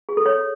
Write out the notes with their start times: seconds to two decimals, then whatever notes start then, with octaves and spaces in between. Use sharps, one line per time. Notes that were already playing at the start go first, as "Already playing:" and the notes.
0.09 G#4
0.17 A4
0.26 C#5